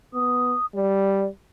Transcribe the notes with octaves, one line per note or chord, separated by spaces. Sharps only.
B3 D#6
G3 D5